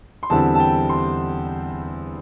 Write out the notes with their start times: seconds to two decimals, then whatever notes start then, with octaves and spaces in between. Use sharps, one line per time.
0.23 C6
0.30 E2 D3 G3 C4 E4 A5
0.55 A5
0.60 G5
0.89 C6